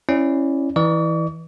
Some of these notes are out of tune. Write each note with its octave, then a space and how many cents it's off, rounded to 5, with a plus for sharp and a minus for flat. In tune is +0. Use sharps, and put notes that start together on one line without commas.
C#4 -20 E4 +0 D5 +0
E3 -15 D5 +30 C#6 +45